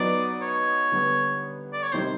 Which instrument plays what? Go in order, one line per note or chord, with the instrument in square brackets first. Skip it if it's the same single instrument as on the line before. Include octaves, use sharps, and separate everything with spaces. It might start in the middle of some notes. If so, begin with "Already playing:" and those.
Already playing: [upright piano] F#3 B3 D#4 [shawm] D5
[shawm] C#5
[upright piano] D3 G3 B3 D4
[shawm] D5
C#5
[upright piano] C3 D#3 G3 C4 D#4 [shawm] C5